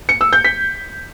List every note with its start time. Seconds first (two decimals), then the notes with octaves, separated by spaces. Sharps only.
0.09 C#7
0.21 E6
0.33 G6
0.45 B6